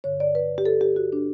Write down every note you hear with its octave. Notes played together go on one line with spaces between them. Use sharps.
G2 D3 C#5
D5
B4
G4
A4
G4
F#4
D4